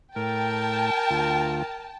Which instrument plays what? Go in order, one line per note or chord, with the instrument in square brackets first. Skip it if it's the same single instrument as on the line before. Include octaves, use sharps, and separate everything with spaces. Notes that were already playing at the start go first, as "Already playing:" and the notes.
[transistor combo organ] A2 [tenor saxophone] A#4 [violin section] G5 A5
[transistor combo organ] D2 F4